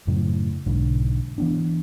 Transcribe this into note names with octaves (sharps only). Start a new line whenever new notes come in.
F#2 A2 C#3
B1 G#2 D3
E3 B3 D4